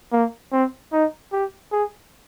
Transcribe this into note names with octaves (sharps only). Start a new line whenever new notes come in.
A#3
C4
D#4
G4
G#4